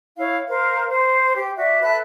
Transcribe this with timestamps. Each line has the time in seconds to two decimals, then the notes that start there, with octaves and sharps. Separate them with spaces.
0.17 E4 C#5 F5
0.48 A#4 C5 F5
0.88 C5
1.36 G4
1.57 F#4 D5 E5
1.82 A4 B4 E5 F#6